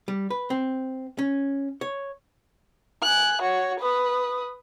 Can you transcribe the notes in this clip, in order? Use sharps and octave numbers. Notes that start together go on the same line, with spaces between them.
G3
B4
C4
C#4
C#5
G#5 F#6
F#4 C#5
B4 D#6